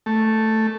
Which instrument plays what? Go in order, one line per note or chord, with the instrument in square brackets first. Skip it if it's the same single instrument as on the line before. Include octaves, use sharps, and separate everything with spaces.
[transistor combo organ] A3